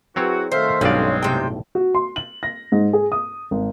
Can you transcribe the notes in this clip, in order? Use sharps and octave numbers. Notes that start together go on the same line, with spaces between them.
F#3 C4 E4 F#4 G#4 B4 C#5
D#3 A3 A4 C5 E5 F5
B1 G2 F#3 G#3 C4 C#4 D5 F5
A2 C3 G5
F#4
C6
F#7
A#6
G#2
G#4
D#6
G#1